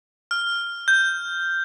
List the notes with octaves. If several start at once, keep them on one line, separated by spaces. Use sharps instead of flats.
F6
G6